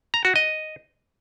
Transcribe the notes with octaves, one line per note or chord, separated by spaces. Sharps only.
A#5
F#4
D#5